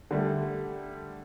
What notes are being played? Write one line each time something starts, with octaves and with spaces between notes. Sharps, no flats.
D3 G3 A3